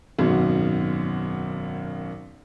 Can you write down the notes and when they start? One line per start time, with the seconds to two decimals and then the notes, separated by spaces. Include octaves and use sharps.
0.19 G#1 F#2 B2